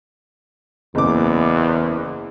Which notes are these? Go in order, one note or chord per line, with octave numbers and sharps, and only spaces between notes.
F#1 E2 D6